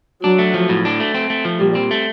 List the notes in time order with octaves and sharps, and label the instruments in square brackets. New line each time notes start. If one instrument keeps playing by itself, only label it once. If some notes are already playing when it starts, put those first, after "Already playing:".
[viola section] F#3 [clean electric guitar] D4
[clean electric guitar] A3
F3
A2
D4
A3
C4
A3
F3
[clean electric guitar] A#2 [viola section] G3
[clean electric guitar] C4
A3